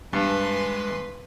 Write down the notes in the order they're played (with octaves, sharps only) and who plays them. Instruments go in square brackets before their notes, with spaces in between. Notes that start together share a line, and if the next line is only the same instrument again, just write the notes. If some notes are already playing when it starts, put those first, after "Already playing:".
[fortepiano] G2 [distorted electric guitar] G#3 A5 [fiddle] B4 C6